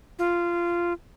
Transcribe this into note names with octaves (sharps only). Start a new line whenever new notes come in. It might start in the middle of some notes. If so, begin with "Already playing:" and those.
F4